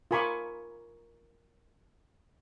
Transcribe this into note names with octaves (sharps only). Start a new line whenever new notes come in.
F4 A#4 G#5 B5 C#6 D6